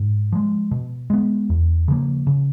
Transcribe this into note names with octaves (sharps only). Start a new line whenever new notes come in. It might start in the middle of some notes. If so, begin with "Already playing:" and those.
Already playing: G#2
F3 G#3
B2
G#3 B3
E2
C#3 F3 A#3
C#3